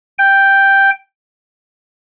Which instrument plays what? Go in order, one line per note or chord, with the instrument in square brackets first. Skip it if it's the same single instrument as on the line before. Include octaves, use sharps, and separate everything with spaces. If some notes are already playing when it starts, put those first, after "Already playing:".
[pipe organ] G5